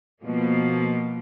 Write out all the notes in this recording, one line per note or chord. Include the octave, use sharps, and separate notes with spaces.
B2 F3 A#3